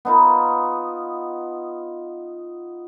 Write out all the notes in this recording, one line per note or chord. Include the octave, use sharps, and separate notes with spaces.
B3 D#4 F4